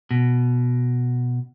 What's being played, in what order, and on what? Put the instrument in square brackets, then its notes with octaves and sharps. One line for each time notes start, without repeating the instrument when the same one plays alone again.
[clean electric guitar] B2